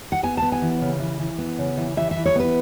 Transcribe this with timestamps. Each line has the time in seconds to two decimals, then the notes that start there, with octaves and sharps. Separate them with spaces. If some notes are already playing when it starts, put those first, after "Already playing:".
0.12 F#5
0.23 B3 G#5
0.37 B3 A5
0.52 G#5
0.62 E3
0.82 C#3
1.00 E3
1.19 E3
1.38 B3
1.58 C#3
1.77 E3
1.97 E3 E5
2.11 E5
2.16 E3
2.26 C#5
2.35 B3 B4